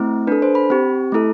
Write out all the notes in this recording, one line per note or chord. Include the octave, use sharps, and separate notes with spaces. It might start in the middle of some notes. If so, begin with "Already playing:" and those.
Already playing: A3 C4 E4
D4 A4 B4
C5
B5
C4 G4
A3 E4 A4